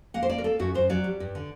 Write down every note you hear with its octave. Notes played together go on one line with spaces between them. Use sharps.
A#3 F#5
C5
A#3 D5
A#4
A#3 A4
F#2 F#4
F#2 C5
F#3 D5
G3
G2
D3